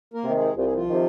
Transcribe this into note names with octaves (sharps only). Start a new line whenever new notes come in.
A#3 A#4
C3 D#3
G#3 G#4
C2 F4
G#4
F3 F4
C3 D#3